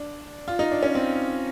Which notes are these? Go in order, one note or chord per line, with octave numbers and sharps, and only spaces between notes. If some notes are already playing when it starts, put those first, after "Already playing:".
Already playing: D4
F4
D#4
D4
C#4
C4